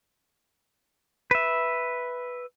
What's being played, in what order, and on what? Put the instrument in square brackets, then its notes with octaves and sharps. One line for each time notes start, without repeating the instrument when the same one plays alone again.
[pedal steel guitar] B4 E5